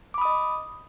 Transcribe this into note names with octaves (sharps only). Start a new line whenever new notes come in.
D#5 B5 D6 D#6